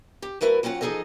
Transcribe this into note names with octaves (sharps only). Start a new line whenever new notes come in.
G4
F#3 A3 E4 A#4 B4
F#3 C4 C#4 F4 F#5
E2 F3 D#4 G#4 A4 D#5